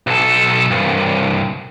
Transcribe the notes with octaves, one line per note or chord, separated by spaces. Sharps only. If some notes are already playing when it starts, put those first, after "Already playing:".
B1 A4
C2 G2